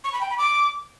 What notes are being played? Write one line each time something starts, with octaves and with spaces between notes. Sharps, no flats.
C#6
B5
G5
B5
D6